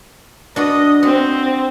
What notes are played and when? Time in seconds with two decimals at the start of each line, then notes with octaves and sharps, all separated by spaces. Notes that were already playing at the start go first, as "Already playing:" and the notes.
0.56 D4 F#4 B4 D#5
1.03 C4 F#4